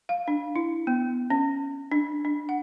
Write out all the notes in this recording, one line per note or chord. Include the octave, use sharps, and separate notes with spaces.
F5
D4
E4
B3
C#4
D4
D4
F#5